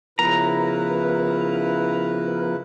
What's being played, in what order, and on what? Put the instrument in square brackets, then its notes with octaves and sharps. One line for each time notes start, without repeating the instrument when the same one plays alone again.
[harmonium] C#3 E4 B4 [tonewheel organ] F3 B3 A#4 [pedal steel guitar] A#5